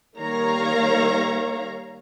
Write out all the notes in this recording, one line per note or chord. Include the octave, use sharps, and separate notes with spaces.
D#3 G3 A#3 C#5 F5 A#5